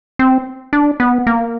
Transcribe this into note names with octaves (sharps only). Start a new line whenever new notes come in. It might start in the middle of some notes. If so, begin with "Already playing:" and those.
C4
D4
B3
A#3